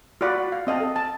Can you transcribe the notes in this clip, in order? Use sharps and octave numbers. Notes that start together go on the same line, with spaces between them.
F4 F#4 D5 F#5 B5
F5
C4 D#5 F5 A5
A4
A5